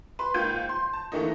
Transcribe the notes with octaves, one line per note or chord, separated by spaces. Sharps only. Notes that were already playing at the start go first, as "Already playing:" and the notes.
B4 C6
G#2 A#3 F4 G5 G6 D#7
C6
A5
D3 E3 A3 A#3 D#4